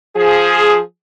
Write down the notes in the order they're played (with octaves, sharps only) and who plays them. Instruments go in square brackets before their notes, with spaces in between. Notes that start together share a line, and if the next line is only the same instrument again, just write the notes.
[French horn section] F3 G#4